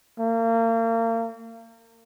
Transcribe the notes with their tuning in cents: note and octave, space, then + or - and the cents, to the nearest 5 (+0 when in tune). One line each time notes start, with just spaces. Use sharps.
A#3 -35